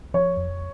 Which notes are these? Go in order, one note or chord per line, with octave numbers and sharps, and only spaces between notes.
F3 C#5
F2